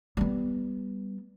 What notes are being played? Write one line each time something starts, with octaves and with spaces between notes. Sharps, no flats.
G3 B3